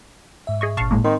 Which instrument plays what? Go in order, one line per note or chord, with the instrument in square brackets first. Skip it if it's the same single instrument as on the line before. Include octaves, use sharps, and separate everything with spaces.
[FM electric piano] G#2 E5
[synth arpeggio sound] G#4 D#5 C#6
[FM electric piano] G1 A#2 [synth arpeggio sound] F5 A5 C#6
[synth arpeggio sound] A2 G#3 A#3
[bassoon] D#3 [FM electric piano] C4 D#4 C6